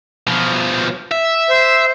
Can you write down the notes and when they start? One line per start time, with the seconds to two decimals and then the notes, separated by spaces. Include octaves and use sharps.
0.27 B2 F3
1.12 E5
1.48 C5